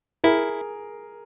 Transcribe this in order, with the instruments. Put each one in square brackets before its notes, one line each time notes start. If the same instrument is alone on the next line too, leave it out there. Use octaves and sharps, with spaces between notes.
[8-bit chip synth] E4 [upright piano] G#4 A#4